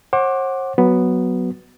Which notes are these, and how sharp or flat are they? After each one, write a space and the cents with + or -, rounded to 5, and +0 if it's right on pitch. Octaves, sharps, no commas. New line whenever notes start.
C5 +45 F#5 +0 D6 +0
F#3 +0 B3 +0